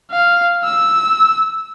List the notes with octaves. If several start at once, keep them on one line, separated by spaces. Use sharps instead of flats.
F5
E6